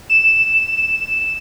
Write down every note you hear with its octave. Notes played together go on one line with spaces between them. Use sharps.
E7